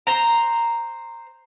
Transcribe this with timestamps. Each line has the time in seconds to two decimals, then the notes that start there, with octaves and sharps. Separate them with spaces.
0.07 C5 A#5